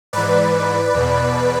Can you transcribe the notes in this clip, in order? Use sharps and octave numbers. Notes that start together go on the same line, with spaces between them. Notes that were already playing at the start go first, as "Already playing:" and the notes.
G#2 E3 B4 D5
E2 B2